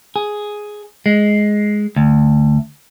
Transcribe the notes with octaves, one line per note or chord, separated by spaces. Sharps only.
G#4
G#3
D2